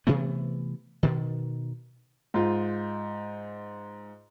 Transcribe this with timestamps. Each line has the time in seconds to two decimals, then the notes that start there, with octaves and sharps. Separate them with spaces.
0.07 C3 E3 A3 B3
1.03 B2 D#3
2.34 G#2 F4